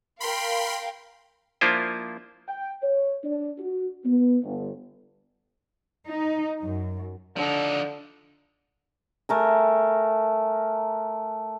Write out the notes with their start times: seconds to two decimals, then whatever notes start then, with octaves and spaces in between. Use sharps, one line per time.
0.20 A#4 F5 G5 B5 C6
1.61 F3 A#3 D4 E4 F4 C5
2.48 G5
2.83 C#5
3.24 D4
3.58 F#4
4.05 B3
4.44 G1
6.08 D#4
6.63 F#2
7.36 D3 F3 D4 D#4
9.29 A3 A#4 G#5